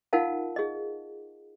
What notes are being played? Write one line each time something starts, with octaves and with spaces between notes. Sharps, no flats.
D#4 F4 A#4 F5 F#5 A5
G#4 D#5